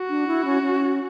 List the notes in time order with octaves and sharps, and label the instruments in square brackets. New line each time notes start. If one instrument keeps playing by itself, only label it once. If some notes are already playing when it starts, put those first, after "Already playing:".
Already playing: [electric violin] F#4
[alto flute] D4
E4
C#4
C#4